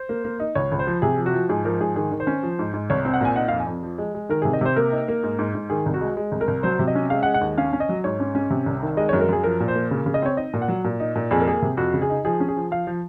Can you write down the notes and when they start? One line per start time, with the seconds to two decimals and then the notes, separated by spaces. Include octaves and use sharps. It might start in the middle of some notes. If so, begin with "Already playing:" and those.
Already playing: C5
0.09 A#3
0.25 A#3
0.40 D#4
0.55 C#2 C#5
0.72 C#2
0.79 C5
0.87 F3
1.02 C3 G#4
1.18 F3
1.26 F#4
1.33 F3
1.49 G#2 G#4
1.65 F3 A#4
1.80 G#2 G#4
1.96 D#3 G#4
2.11 D#3
2.20 C5
2.27 C#4
2.43 F3
2.59 G#2
2.74 G#2
2.90 C2 C#5
3.05 C4
3.14 F#5
3.21 A#2 G#5
3.36 D#4 F#5
3.48 F5
3.52 F2
3.60 G#5
3.67 F2
3.83 F3
3.98 G#3
4.15 G#3
4.29 D#3 A#4
4.42 C3 G#4
4.53 D#5
4.61 C3 C5
4.76 A#3 A#4
4.92 D#4
5.08 A#3
5.23 G#2
5.39 G#2
5.55 G#2
5.70 D#3 G#4
5.86 C2
5.94 F#4
6.01 G#3
6.17 G#3
6.32 C2
6.41 A#4
6.48 C2
6.63 F#3 C5
6.79 C3
6.88 D#5
6.95 C#4
7.10 G#3 F5
7.23 F#5
7.26 G#3
7.34 F#5
7.41 D#2
7.58 C#4 F5
7.73 C#4
7.80 D#5
7.89 F#3
8.04 G#2 C#5
8.20 C#4
8.35 C#4
8.50 C3
8.66 C2
8.82 D#3
8.97 G#3 D#5
9.09 C#5
9.13 F#2
9.21 A#4
9.29 F#2 G#4
9.44 F3 A#4
9.60 A#2
9.68 C5
9.75 A#3
9.91 C#3
10.06 C#3
10.14 D#5
10.22 C4 C#5
10.37 D#4 D#5
10.54 A#2
10.62 F#5
10.68 F#3
10.84 A#2
11.00 D#4
11.16 A#2
11.31 F2 G#4
11.40 A#4
11.47 A#3 G#4
11.62 C3
11.77 F2 F#4
11.94 C#3
12.02 G#4
12.10 D#4
12.25 F3 G#4
12.40 C#4
12.48 G#4
12.56 F3
12.71 F3 F5
12.87 F3